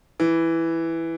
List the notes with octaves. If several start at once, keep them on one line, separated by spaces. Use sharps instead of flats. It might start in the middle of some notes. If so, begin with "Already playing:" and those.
E3